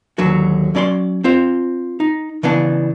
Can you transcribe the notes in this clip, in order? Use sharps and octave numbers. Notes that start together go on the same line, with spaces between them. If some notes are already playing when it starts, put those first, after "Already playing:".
D#2 D3 F#3 F#4
F#3 C#4 D5 B5 C6
C4 F4 C5
D#4
C#3 E3 B3 D4